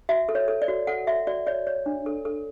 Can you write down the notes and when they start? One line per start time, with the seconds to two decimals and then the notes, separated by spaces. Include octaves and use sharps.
0.09 F#4 E5
0.29 A4
0.35 C#5
0.48 A4
0.62 D5
0.68 F#4
0.87 A4 F#5
1.07 F#4 E5
1.27 F#4 D5
1.46 C#5 D5
1.67 C#5
1.86 D4
2.06 A4
2.25 A4